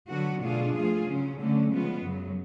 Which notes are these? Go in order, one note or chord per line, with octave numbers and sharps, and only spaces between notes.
D3 F#3 B3 F#4
B2 A3 D4 F4 G#4
F3 A3 F4 G#4
C#3 F#3 C#4
D3 F#3 A3 C#4
C#3 F3 G#3 B3 F4
F#2 C#3 F#3